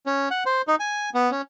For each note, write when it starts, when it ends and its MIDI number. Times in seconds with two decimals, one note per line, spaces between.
0.06 0.29 61
0.31 0.44 78
0.46 0.62 72
0.68 0.75 63
0.80 1.10 80
1.14 1.31 59
1.31 1.42 61